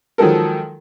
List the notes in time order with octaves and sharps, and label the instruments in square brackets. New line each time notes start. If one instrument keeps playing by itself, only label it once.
[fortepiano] D#3 F3 F#3 G#3 A4 A#4